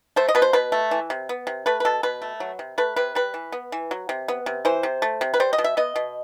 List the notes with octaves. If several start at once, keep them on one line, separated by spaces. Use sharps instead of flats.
A3 C5
D#5
B2 B4
C5
B2 B4
A3
E3
C3
B3
C3
A3 B4
B4
B2 A4
B2 B4
A3
F#3
C3
A3 B4
C3 B4
G3 B4
E3
B3
E3
F#3
C3
B3
C3
E3 C5
C3
A3
C3
B4
G3 C5
D#5
B2
E5
B3 D#5
B2